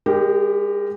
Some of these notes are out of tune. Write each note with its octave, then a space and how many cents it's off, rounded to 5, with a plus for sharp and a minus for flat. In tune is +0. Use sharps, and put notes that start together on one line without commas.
G#3 -35 G4 +0 A#4 +0